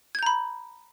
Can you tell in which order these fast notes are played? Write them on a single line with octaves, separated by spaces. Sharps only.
G#6 G6 A#5 B5